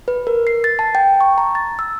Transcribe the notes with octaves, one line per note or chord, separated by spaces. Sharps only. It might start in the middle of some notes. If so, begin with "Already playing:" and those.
B4
A#4
C7
A6
A5
G5
C#6
A#5
A6
E6